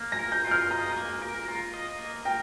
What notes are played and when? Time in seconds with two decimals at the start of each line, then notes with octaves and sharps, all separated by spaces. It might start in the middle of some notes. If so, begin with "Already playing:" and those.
Already playing: A#3
0.12 A#6
0.19 A#4
0.32 G6
0.44 F4 G6
0.51 F6
0.71 D#5 A#5
0.96 A#3
1.22 A#4
1.48 F4
1.74 D#5
1.99 A#3
2.25 A#4 G5